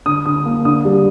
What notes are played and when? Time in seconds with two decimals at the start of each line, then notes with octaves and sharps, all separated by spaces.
0.06 D3 D#6
0.26 D3 D#6
0.45 A#3
0.65 D3 D#6
0.85 G3